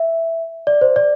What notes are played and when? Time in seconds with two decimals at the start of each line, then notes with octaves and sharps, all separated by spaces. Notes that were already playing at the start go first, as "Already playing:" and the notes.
Already playing: E5
0.67 D5
0.81 C5
0.96 D5